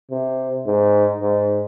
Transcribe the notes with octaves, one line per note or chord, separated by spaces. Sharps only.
C3
G#2
G#2